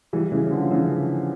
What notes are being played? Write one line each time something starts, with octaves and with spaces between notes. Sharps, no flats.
E3 G3
C#3 E3
D3 F3
C#3 E3